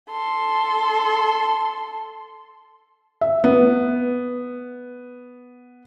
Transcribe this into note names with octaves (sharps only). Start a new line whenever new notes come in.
A4 C6
E5
B3